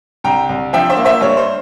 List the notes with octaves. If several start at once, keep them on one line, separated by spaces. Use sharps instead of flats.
C2 G5 A#5
C2
F3 E5 G5
C5 E5
A#3
C5 E5
G2 C#5
C5